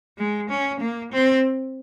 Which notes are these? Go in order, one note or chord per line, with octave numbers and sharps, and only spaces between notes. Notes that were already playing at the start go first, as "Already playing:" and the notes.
G#3
C#4
A#3
C4